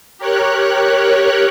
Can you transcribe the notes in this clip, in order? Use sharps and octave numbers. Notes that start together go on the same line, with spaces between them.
G4 A#4 C#5 F#6